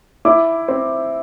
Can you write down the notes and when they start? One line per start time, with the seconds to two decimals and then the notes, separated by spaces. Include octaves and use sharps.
0.25 E4 D6
0.68 C4